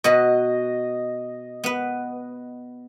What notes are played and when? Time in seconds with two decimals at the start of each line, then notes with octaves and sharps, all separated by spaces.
0.04 B2 F#4 B4 D#5
1.64 B3 B4